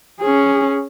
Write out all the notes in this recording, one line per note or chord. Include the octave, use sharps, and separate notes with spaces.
C#4 G#4